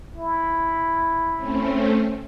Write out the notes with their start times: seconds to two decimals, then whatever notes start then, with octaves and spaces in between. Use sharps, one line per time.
0.16 E4
1.37 A3 C4 C#4